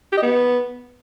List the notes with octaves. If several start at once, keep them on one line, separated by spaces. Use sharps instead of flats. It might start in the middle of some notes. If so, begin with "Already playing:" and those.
G4
D#5
B3